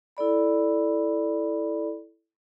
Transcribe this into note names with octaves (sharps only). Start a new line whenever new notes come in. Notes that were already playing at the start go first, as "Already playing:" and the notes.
E4 A4 D5 B5